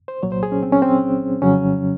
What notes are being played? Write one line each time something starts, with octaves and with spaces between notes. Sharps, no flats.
C5
C2 A#2 F#3 C#5
C5
G#4
C#4
C4
C#4
C4
F2 C#3 F#3 C#4